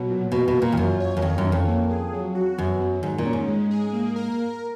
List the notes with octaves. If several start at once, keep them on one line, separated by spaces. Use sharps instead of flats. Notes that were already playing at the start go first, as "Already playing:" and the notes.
Already playing: B2 F#3
A#2
B2 A#3
B2
A#4
A#2
F2
F#2 F4
C#5
F#2
F2 D#3
F#2
C#4
F2
A#3
G#4
F#3
F#4
F#2 B3
F#3
G#2 D#3
A#2
C#4
G#2
G#3
G#4
A#3
A#4